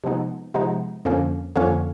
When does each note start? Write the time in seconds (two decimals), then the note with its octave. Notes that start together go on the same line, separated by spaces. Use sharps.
0.04 C3 F3 G#3 B3 D#4
0.54 C3 F3 G#3 B3 D#4
1.05 F2 D3 F3 A#3 C#4
1.56 F2 D3 F3 A#3 C#4